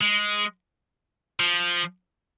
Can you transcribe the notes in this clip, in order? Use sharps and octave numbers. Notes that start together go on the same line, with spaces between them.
G#3
F3